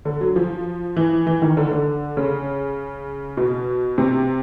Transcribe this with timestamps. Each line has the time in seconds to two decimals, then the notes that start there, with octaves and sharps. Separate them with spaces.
0.05 D3
0.21 F#3
0.36 F3
0.96 E3
1.27 E3
1.42 D#3
1.57 D3
1.72 D3
2.17 C#3
3.37 B2
3.98 C3